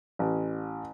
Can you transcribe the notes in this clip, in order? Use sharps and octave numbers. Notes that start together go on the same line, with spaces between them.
A1